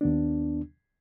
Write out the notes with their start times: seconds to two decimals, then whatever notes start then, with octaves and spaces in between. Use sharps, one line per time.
0.01 D#2 B3 D4